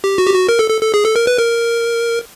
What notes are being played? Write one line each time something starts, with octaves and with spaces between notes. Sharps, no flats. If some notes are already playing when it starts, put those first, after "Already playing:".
G4
F#4
G4
F#4
A#4
A4
A4
A4
G#4
A4
A#4
B4
A#4